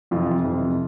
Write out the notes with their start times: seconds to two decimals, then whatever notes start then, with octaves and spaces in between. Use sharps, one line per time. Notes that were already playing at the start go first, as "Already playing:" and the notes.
0.11 F2 C3 E3 F4
0.44 F2 C3 E3